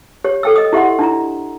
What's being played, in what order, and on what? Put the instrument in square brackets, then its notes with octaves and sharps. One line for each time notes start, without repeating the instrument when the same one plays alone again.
[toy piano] G4 C#5
A4 G5 E6
D#5 D#6
E4 G4 E5 F#5 C6
D4 E4 A#5